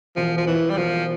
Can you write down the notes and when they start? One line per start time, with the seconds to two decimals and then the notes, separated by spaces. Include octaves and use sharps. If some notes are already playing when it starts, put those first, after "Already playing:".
0.16 E1 F3
0.38 F3
0.47 E2 E3
0.70 G3
0.77 E1 F3